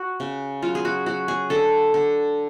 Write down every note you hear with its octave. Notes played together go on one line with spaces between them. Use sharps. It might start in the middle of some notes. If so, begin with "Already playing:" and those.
Already playing: F#4
C#3
F#3 F4
G#4
F#4
F#3 F#4
G#4
D3 A4
D3